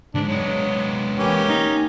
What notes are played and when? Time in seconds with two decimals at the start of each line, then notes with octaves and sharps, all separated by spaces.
0.15 D2 G#2 D4
0.28 F#3 G#3 B3
1.18 E3 A#3 C#4 G4
1.49 D#4